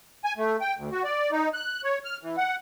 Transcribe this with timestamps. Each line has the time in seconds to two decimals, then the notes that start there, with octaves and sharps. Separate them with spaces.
0.24 G#5
0.37 A3
0.61 G5
0.77 D2
0.92 F#4
1.04 D5
1.32 D#4
1.54 F#6
1.84 C#5
2.05 F6
2.22 E3
2.37 F#5